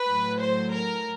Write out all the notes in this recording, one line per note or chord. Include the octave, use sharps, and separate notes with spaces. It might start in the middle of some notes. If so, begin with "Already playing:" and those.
Already playing: B4
A2 F#3
C5
A#4